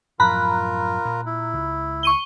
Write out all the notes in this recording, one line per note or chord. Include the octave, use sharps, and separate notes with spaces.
F#2 A2 F3 F4 A#4 A#5 B5 F#6
A#2
E4
C#2
C#6 D#7 G7